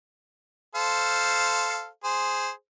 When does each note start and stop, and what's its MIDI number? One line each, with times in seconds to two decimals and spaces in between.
0.75 1.87 69
0.75 1.87 72
0.75 1.87 77
2.04 2.50 68
2.04 2.50 72